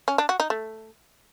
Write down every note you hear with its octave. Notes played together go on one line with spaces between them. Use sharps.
C#4
D4
F#4
D#4
A3